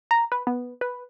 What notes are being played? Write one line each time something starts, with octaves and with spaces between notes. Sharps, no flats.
A#5
B4
B3
B4